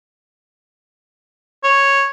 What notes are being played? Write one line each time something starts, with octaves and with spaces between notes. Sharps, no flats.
C#5